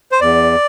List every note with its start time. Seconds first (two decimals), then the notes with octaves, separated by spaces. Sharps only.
0.12 C5
0.21 E2 D5